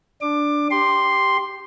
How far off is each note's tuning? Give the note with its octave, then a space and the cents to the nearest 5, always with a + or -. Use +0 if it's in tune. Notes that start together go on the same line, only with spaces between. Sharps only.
D4 -5 D6 +20
G4 +0 C6 +0